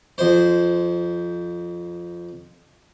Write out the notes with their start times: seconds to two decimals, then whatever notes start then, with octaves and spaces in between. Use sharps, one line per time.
0.18 F2 C5